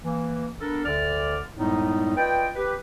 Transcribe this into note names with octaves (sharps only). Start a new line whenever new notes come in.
E3 A#3
B3 D4 A4 A#4
D2 D3 D5 F6
F#2 A2 G3 G#3 B3 D#4
F4 B4 D5 D#5 G5
G4 B4